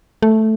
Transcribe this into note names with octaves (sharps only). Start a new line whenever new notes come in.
A3